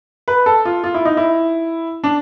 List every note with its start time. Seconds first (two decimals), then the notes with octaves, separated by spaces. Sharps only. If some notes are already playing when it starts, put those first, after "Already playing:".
0.28 B4
0.46 A4
0.65 F4
0.84 F4
0.94 E4
1.05 D#4
1.17 E4
2.04 D4